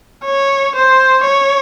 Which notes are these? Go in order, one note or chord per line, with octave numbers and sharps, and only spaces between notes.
C#5
C5
C#5